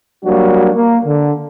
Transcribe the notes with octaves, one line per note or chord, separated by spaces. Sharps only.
F#3 G3 A#3 D4 F#4
A#3
D3